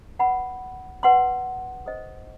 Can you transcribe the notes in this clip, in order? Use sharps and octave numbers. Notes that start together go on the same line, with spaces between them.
B4 F#5 B5
B4 F#5 C6
A4 C5 D#5